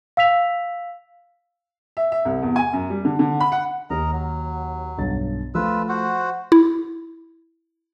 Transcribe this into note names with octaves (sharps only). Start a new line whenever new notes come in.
F5 E6 B6 F7
E5
E5
C2
E2
G#5
F#2
G3
D3
D3
B5
F#5
D#2 G4 A#4 D#5 A#5
F#3
B1 G2 A6
F3 A3 F4 B4 E6
F#4 C5 F#5
E4